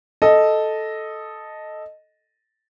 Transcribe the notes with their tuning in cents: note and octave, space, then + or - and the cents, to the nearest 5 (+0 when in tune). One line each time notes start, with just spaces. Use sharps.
A4 -5 D#5 +0